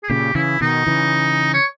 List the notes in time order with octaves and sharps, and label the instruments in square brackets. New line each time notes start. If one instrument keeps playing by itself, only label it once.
[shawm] G#4
[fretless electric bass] A#2 C#3 [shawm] G4
[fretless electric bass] C#3 E3 [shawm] E4
[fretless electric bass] B2 D#3 [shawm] D#4
[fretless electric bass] C#3 E3
[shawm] C#5